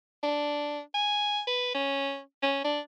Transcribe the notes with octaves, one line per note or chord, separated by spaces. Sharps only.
D4
G#5
B4
C#4
C#4
D4